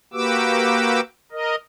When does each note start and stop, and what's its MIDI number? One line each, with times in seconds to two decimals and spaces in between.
0.13 1.00 58
0.13 1.00 66
0.13 1.00 67
0.13 1.00 71
0.13 1.00 86
0.13 1.00 88
1.32 1.56 70
1.32 1.56 75